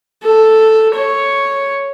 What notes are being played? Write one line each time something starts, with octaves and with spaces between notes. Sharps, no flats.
A4
C#5